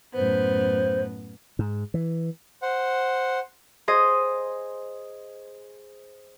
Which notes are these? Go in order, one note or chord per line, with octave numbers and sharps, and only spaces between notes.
F#2 A2 B3 C5
G#2
E3
C5 F#5
G#4 C5 D#5